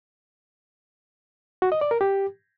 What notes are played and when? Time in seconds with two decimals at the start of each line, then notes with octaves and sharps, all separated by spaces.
1.62 F#4
1.72 D#5
1.81 D5
1.91 A#4
2.01 G4